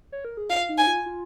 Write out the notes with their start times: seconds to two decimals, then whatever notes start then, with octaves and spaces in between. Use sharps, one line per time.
0.12 C#5
0.25 A#4
0.37 G#4
0.50 F4 F5
0.69 D#4
0.78 G#5
0.87 F4
1.06 F4